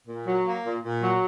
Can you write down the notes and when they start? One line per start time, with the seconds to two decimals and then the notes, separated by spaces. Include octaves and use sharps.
0.07 A#2
0.26 F#3
0.45 A#3
0.65 A#2
0.83 A#2
1.01 F#3